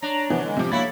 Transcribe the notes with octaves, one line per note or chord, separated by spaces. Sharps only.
D4 C#5 A#5
C3 E3 F3 B3
D3 G#3
C3 F3 G4
A#3 E4 F#4 A4 C#5 B5 A6